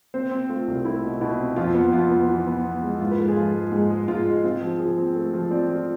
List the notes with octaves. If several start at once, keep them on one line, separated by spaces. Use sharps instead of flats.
C4 C5
C4
A3 F4
C2
A3 E4
B2
B2 E4
C4
F2 F4
B3
F2 F4
B3
E3
B3
B3
G#3
G#2 F4
B4
G#2 A4
G#4
F3 F4
G#3
G#2 G#4
G#3
G#2 F4
G#3
C4 F4
F3
F3 G#4
C4
A3 A4
F3
C4 D5
F3